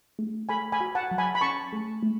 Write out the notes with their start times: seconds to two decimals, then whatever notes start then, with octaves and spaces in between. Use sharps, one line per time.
0.19 A3
0.49 A3 G#5 B5
0.72 G#5 B5
0.81 F#4
0.95 F#5 A5
1.11 F#3
1.18 G#5 B5
1.35 B5
1.41 C#4 A5 C#6
1.73 A3
2.03 A3